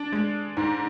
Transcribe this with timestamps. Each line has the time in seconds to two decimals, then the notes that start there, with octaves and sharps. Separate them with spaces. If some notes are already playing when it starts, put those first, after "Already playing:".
Already playing: D4
0.12 G#3
0.57 G#2